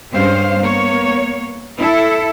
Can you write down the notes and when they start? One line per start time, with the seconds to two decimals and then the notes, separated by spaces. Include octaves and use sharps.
0.12 G2 G#3 C#4 C5 F5
0.60 A#3 B3 C#5
1.78 E4 A4